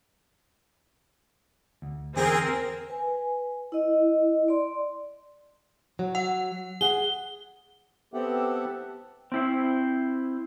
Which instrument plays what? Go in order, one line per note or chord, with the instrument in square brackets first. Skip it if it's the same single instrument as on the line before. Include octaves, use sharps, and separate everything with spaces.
[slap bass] D2
[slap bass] E2 D3 [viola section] C4 A#4 [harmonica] G#4
[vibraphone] B4 G#5
E4 D#5
D5 C6
[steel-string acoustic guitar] F#3
[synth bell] F#5
[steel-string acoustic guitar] G#4 F#5 [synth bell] G7
[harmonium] B3 C4 G4 A4 E5 F#5
[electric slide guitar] C4 E4 C5